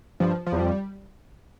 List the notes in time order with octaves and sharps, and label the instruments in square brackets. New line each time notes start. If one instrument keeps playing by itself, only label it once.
[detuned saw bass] G2 [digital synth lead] F3
[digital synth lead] F3
[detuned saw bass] E2
[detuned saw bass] F2 [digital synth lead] G3